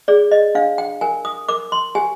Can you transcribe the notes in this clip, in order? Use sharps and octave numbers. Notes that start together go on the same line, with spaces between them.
G#4 D5
D#5
D4 F5
G5
A#4 G#5
D#6
A#4 D6
C6
G4 G#5